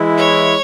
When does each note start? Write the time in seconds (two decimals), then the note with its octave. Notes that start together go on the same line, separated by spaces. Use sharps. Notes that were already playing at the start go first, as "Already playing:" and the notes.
Already playing: E3 G#3 E4
0.17 C#5